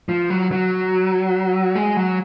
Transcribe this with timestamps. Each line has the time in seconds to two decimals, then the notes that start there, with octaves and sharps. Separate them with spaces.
0.09 F3
0.30 F#3
0.51 F#3
1.75 G#3
1.97 F#3